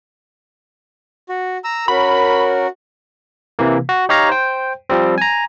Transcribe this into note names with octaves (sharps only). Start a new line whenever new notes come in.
F#4
A#5 E6
C#4 F#4 A#4 B5
C3 E3 A#3
F#4
D#4 G4 C#5 F5 A#5
C5 G5
F3 G3 C4
G#5 A#5